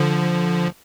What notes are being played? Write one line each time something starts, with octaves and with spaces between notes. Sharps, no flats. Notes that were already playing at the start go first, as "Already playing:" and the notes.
Already playing: D3 F3